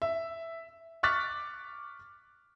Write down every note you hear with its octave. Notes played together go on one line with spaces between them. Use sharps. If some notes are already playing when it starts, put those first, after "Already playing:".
E5
C#6 D6 F6 F#6 A6 B6